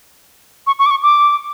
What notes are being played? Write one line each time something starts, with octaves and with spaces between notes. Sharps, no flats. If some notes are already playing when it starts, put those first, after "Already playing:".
C#6
C#6
D6
C#6
D6